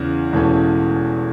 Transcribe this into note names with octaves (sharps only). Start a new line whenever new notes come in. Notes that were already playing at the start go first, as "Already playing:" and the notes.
Already playing: E2 C#3 E3
E1 E2 E3 A3 C#4